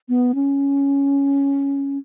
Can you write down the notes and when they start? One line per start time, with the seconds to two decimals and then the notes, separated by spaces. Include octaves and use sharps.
0.09 B3
0.35 C#4